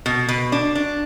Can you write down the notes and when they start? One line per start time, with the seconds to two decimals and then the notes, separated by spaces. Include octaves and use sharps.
0.06 B2
0.29 B2
0.52 D4
0.75 D4